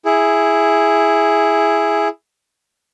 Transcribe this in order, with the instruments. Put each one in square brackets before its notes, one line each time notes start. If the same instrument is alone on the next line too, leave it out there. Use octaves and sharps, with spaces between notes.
[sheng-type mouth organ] E4 G#4